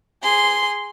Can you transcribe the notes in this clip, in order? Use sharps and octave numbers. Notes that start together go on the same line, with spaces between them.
G#4 C6